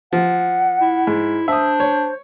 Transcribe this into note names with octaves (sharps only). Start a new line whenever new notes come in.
F3 F#5
E4
G#2
D4 C5 E5 D#6
C#5